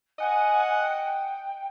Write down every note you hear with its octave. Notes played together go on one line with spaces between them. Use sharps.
D#5 F#5 G#5
G5